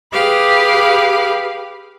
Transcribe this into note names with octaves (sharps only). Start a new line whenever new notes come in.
G4 G#4 B4 F5